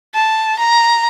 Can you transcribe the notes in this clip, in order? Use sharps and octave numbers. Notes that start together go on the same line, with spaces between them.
A5
A#5